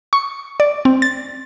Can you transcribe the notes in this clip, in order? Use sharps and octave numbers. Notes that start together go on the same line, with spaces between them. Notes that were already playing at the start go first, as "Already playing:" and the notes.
C#6
D5
C4
A6